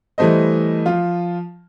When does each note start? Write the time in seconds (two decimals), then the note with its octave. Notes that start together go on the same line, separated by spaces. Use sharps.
0.18 E3 G3 A3 C5 D#5
0.86 F3 F4